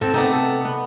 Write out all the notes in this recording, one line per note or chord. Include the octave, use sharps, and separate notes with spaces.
G#2 C4 A4
C3 A3 B3 D#4 D5
A4
B3